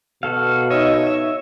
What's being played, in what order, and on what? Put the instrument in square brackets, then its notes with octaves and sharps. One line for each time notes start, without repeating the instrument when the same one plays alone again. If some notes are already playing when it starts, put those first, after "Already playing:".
[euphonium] B2 [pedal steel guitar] F#4 A4 F5
[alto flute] D#4 [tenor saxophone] C#5 [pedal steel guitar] D#5 E5
[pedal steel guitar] E5